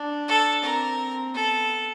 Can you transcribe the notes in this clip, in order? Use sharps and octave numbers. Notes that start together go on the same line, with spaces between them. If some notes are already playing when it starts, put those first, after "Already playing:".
Already playing: D4
A4
C4 A#4
B3 A4